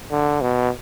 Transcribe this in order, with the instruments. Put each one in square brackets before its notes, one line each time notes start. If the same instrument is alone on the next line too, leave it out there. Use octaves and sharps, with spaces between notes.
[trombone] D3
B2